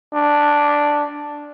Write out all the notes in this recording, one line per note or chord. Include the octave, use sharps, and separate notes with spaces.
D4